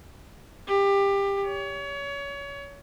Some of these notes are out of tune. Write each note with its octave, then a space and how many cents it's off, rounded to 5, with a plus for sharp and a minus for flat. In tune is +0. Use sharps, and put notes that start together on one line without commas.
G4 +20
C#5 +30